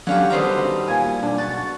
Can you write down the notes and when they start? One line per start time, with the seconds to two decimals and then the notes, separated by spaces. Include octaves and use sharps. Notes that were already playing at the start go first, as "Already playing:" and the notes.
0.07 D3 F#3 C#4 G4 F5 F#5
0.30 D3 D#3 G3 B3 C5 A#5
0.88 A#2 G#5
1.23 B1 D4
1.38 F#4 A6